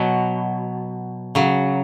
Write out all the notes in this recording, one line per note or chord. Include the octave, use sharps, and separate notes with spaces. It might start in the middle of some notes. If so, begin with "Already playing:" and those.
Already playing: B2 F#3
C#3 F#3